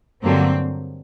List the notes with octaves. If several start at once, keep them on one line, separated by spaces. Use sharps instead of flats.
G2 D3 F#3 A#3 C4